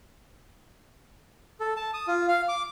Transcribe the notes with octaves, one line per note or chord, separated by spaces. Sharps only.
A4
A5
D#6
F4
F5
D6